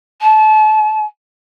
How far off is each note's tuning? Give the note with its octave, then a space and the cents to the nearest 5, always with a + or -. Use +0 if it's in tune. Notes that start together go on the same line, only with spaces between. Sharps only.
A5 -30